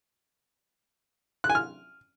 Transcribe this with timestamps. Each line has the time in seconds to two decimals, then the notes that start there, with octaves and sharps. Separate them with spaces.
1.44 F#6
1.50 G#5
1.55 F6